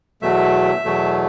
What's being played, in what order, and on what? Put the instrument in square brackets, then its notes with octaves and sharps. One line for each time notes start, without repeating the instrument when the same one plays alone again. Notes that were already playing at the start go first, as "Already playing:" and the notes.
[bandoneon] E2 B2 F#3 A3 E5
E2 B2 F#3 A3